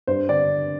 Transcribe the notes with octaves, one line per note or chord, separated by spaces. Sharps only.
G2 C5
D3 D5